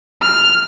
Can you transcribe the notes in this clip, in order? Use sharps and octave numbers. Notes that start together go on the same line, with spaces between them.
F6